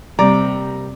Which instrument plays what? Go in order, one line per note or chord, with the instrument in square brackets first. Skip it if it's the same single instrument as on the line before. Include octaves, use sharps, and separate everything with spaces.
[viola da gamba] C3 [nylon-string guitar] G3 A#3 C4 [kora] D5 [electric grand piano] A#5